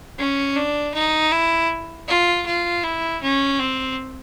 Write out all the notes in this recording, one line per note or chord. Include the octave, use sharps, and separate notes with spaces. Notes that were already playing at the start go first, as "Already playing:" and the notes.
C#4
D4
D#4
E4
F4
F4
E4
C#4
C4